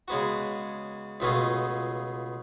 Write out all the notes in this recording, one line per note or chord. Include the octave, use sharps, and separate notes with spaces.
C#3 G#3 B3 F#4
C#2 B2 A3 F4 G#4